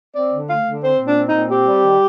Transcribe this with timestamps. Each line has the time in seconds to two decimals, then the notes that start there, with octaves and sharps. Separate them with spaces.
0.15 C4 D5
0.32 D3
0.49 A3 F5
0.67 D3
0.83 C4 C5
1.00 A#2
1.06 D4
1.18 C4
1.28 D#4
1.34 A#2
1.50 C4 G4
1.67 G3
1.85 D#3